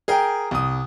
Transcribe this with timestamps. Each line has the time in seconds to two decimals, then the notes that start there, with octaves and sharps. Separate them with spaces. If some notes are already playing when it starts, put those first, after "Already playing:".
0.08 G#4 A#4 G5
0.51 C2 D#6